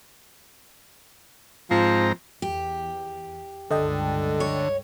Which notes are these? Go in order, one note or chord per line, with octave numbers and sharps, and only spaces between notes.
G#2 F3 C4 A#5
E2 G4
C#2 G2 D3 A4 D#5 G5
C#5